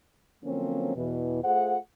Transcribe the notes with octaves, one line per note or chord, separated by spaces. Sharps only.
D3 F3 F#3 A#3 C4 C#4
E2 B2 E3
A3 F4 G#4 C5 F#5